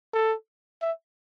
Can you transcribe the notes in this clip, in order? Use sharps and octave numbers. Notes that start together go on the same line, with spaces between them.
A4
E5